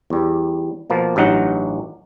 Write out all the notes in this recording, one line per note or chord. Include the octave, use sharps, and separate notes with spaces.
E2 G3
B2 F3 A#3
A1 G2 F#3 D#4 F#5